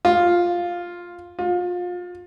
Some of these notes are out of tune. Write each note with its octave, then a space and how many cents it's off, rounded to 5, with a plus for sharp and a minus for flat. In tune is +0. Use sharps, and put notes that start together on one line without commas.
F4 +5
F4 +30